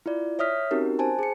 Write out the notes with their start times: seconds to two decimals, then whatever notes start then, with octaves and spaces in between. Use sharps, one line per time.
0.06 E4 F4 D5
0.39 C#5 E5 D#6 F6 B6
0.71 C4 C#4 D#4 F#4 G4 A#4
0.99 C5 G#5 A5
1.19 G#4 C#7